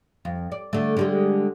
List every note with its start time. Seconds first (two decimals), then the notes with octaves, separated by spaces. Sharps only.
0.25 F2
0.52 D5
0.73 D3 A3
0.97 D3 G3 G#3